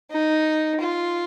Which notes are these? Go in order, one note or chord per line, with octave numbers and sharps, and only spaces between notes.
D#4
F4